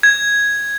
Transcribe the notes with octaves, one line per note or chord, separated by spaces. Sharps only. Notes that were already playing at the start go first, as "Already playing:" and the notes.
G#6